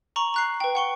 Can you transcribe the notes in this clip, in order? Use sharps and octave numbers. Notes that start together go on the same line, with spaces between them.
A#5 C#6 F#7
A#5 F#6 C7
B4 G5
F#5 C#6 G7